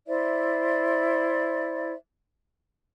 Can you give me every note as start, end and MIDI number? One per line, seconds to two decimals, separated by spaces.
0.07 1.93 64
0.07 1.93 72
0.07 1.93 74
0.07 1.93 76